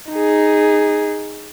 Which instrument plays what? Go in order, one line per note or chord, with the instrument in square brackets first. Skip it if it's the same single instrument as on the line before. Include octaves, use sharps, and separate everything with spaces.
[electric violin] D#4 G#4